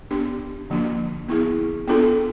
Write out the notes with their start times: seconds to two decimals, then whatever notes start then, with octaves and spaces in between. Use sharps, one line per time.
0.11 B3 D4 G4
0.70 D3 F3 A#3 D4 F#4
1.29 B3 E4 G#4
1.88 B3 D4 F4 A4